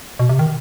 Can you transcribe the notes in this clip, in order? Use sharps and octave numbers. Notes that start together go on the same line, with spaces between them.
B2
C3
D#3